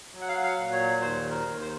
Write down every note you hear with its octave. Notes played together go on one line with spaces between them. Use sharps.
F#3
F#5
F5
F#5
F5
A#2
C#5
D#2 C5
A#4
D#2
C5